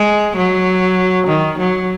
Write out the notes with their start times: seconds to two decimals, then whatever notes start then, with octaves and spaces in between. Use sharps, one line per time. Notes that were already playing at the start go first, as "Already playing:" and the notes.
Already playing: G#3
0.37 F#3
1.27 D#3
1.58 F#3